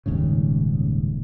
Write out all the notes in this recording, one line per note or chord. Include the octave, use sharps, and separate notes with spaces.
D#1 D#2 G#2 C#3